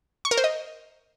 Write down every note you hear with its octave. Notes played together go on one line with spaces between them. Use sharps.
C#6
A#4
C5
D#5